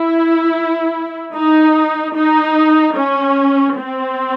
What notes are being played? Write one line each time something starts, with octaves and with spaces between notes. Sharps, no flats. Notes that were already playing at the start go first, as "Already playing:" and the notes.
Already playing: E4
D#4
D#4
C#4
C4